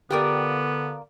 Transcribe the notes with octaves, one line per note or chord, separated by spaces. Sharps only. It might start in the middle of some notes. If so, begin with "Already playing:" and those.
D3 B3 F4 G4 A#4 D5 F5 G5